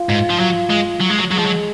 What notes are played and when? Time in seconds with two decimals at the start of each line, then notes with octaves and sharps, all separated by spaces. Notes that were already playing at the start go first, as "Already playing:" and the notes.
Already playing: F4
0.09 G#2
0.30 F3
0.39 F#3
0.70 G#3
1.00 F#3
1.10 G#3
1.19 F#3
1.31 F#3 G#3
1.39 F3
1.46 F#3